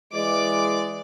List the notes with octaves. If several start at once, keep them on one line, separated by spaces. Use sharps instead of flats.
E3 G#3 D5 D6